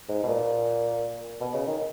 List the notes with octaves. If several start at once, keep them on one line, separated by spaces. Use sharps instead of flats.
G#2
B2
A#2
B2
C#3
D#3